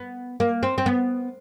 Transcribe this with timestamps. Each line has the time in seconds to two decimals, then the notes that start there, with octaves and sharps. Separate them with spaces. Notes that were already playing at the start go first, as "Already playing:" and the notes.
Already playing: B3
0.40 A#3
0.63 C4
0.78 C4
0.86 B3